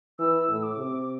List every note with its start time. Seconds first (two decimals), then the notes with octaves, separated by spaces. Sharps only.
0.19 E3 E6
0.49 A2
0.63 D6
0.78 C3